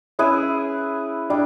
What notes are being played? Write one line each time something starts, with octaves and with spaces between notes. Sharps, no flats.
C#4 E4 G#4 B4 E5
G3 D4